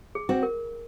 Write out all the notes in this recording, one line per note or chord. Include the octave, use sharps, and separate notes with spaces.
G#4
C4 F#4
A#4